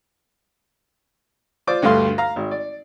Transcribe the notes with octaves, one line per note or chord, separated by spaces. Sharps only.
F4 C5 D5 D6
D2 G2 A3 F5 C6
F5 A#5
G#1
D5